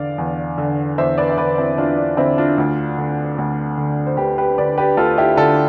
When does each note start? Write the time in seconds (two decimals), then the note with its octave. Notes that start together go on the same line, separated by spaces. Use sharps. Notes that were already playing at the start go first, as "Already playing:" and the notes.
Already playing: E2 D3 D5 F5
0.18 E2
0.58 D3
0.98 E2 C5 E5
1.18 B4 D5
1.30 E5
1.37 D3 B4 D5
1.58 C4 E4
1.78 E2 D4 F4
1.98 D4
2.17 D3 C4 E4
2.38 D4 F4
2.58 D2
2.98 D3
3.38 D2
3.77 D3
4.07 C5
4.17 D2 G4 B4
4.38 G4 B4
4.58 D3 B4 D5
4.78 G4 B4
4.97 D2 F4 A4
5.18 E4 G4
5.37 D3 F4 A4